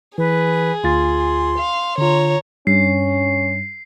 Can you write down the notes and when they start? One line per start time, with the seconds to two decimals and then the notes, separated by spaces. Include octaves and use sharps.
0.18 E3 G#4 B4
0.84 D2 F4 C6 A6
1.58 F5
1.98 D3 F4 C#5 A#5
2.67 G2 C#4 C7